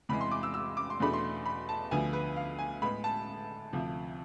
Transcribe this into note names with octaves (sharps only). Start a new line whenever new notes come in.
E2 C3 E3 G#3 B5
C6
D6
E6
E6
D6
C6
E2 B2 A3 D4 B5
C6
B5
A5
D2 D3 F3 B3 G#5
B4
F5
G#5
A2 G#3 B3 B5
A5
D2 C3 F3